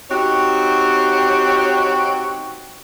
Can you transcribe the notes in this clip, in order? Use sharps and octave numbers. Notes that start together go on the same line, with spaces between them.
C4 D#4 F#4 G4 C#5